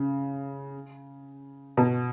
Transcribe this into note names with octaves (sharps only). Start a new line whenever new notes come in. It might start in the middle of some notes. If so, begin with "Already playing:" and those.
Already playing: C#3
B2